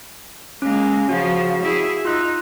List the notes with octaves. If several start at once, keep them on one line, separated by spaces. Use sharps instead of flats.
G#3 A#3 C#4
C#3 F3 F#4
E4 G#4
D#4 F4 E6 F#6